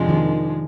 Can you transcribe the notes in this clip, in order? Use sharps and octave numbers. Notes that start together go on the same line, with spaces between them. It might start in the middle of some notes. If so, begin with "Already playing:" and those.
Already playing: F2 C3 F3 G#3 D4
D#3